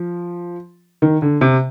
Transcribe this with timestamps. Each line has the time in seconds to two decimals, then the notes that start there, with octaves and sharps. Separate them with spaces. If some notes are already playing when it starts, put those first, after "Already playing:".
Already playing: F3
1.02 D#3
1.22 D3
1.41 C3